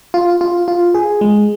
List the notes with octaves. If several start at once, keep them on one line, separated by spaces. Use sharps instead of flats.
F4
F4
F4
G#4
G#3